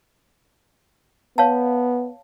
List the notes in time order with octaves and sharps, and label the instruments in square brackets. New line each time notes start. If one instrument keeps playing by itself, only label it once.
[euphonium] B3 [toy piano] C#5 F5 A5